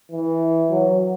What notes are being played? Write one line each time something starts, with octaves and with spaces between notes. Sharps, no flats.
E3
F#3